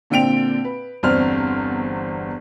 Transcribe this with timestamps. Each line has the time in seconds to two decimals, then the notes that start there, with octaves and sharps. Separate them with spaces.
0.10 A#2 D3 C4 G5 D7 F7
0.65 B4
1.03 G1 E2 C4 C5 D5 F6